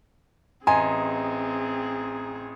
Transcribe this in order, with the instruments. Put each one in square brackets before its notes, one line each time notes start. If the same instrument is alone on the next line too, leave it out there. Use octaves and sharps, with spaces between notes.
[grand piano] A1 D#5 C6 [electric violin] C4 G#4 [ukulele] G#5 [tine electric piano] A#5